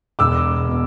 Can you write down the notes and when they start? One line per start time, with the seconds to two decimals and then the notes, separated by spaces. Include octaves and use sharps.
0.19 E1 D6 E6
0.68 B2